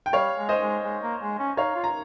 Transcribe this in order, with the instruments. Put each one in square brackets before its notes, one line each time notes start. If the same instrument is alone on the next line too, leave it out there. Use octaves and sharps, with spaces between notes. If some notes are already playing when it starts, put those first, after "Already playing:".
[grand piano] G5
[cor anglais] G3 [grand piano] C#5 F5
[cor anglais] G#3
[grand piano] C5 D#5
[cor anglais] G#3
G#3
A#3
G#3
C#4
[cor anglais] D#4 [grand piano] C#5 F5
[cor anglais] F4
[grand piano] A#5